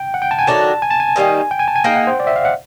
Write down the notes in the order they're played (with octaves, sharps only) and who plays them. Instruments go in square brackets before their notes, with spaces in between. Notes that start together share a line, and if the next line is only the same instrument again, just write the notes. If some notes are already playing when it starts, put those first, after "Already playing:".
Already playing: [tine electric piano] G5
F#5
G5
A5
G#5
[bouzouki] D#3 F#3 A3 D4 [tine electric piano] A5
[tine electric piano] G#5
A5
G#5
[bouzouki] D#3 G3 A#3 D#4
[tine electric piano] G5
G#5
A5
G#5
[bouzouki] A#3 D#4 G#4 [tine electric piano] G5
[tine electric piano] F#5
C5
D5
E5
F5
F#5